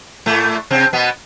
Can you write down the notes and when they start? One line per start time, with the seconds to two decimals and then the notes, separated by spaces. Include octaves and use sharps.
0.26 A2 A3
0.70 C3 C4
0.93 B2 B3